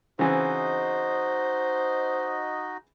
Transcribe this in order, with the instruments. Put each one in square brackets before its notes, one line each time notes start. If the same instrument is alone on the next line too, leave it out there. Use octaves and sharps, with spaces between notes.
[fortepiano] C#3 E3 C4 [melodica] D#4 F#4 D#5 [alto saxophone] C5